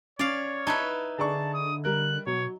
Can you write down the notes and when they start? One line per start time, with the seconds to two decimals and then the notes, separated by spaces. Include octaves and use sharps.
0.19 C#4 C#5 D5 F5
0.67 D#4 E4 B4 A5 A#5 G#6
1.18 D3 G#4 D5 A5 C#6
1.54 D#6
1.85 G3 A#4 F#6
2.27 B2 F#3 C#5